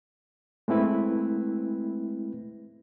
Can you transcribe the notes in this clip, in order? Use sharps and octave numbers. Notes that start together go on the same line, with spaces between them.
G#3 A3 C4 E4 B4